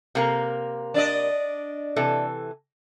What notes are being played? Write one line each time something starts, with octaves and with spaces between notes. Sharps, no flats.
C3 A#3 A#4
D4 D5 D#5
C3 E3 A4